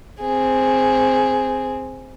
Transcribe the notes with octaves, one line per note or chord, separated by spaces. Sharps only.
C4 G#4